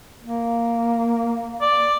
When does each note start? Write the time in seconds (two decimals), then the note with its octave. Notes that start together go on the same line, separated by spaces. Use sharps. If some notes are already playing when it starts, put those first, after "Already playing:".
0.23 A#3
1.61 D5